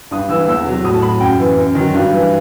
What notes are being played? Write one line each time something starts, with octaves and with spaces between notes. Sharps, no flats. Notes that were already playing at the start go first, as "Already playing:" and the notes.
G2 D#6
E3 E6
E2 E6
C3 F#3
A2 D#6
A5
F#3 B5
F#2 G5
E3
F#2
D#3 F#3
G2
E3